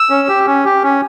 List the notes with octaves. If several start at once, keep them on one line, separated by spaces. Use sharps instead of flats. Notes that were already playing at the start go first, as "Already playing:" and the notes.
Already playing: E6
C#4
G4
C#4
G4
C#4